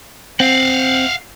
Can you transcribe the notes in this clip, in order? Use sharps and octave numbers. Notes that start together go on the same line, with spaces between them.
C4 F5 F#5